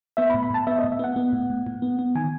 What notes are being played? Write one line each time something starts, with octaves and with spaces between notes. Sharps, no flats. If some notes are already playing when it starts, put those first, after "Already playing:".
B3 E5
B5
A2
B5
A2 A5
B3 E5
D#5
A2
E5
B3 F#5
B3
A2
A2
A2
B3
B3
D#3 G#5